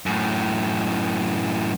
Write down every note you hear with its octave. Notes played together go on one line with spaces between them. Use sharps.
F#2 A2